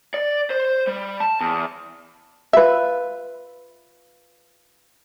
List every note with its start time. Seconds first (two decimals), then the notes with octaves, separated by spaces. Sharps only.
0.14 D5
0.50 C5
0.87 G3
1.20 A5
1.41 E2
2.53 F4 B4 E5